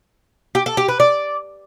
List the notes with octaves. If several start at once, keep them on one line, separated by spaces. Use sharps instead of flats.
G4
A4
G4
B4
D5